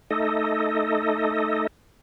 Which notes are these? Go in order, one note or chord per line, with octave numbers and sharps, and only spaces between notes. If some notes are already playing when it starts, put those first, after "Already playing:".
A3 D#4 A4 D#5